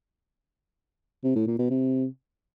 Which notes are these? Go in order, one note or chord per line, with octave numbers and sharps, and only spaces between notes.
C3
A2
A#2
B2
C3